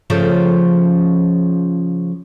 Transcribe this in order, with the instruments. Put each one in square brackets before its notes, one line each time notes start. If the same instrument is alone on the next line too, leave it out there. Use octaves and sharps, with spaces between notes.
[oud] C#3 F3 A3